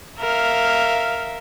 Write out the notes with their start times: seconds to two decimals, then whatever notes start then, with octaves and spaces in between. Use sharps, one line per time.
0.19 A#4 E5 F5